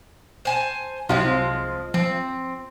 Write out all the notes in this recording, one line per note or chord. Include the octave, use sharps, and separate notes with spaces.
C5 G#5 A5
C2 C3 F3 F#3 G#3 C4
F3 C4